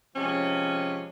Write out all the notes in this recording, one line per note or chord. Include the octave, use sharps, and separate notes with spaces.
C3 F3 G#3 C#4